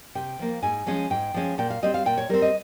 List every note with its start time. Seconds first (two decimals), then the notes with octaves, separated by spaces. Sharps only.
0.15 C3 G5
0.39 F3 A#3
0.62 G#2 G#5
0.87 F3 G#3 C#4
1.10 G#2 G5
1.34 F3 G#3 C#4
1.58 A#2 G5
1.70 F5
1.83 G3 C4 D#5
1.94 F5
2.05 A#2 G5
2.17 C#5
2.29 G3 C4 A#4
2.42 D#5